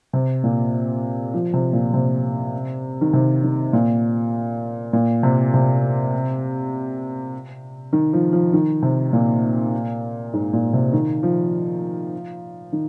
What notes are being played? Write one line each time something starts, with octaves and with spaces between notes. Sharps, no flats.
C3
A#2
F3
C3
A#2
C3
D#3
C3
D#3
A#2
A#2
C3
C3
D#3
F3
F3
D#3
C3
A#2
G#2
A#2
C3
D#3
F3
D#3